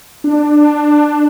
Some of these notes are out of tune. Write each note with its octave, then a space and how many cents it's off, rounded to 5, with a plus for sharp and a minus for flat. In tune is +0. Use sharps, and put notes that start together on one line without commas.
D4 +15